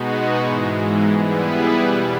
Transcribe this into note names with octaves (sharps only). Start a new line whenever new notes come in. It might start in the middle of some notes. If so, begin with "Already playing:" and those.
Already playing: B2 G#3 B3 D#4 F#4
G#2 E3 G#3
G3 B3 E4 G#4 B4
E2 B2 G3